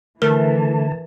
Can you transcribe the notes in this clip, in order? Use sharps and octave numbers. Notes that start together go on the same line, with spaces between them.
D3 E3 A3 A#4 A5